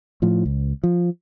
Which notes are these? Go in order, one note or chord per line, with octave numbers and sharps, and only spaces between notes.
A2 F3
C#2
F3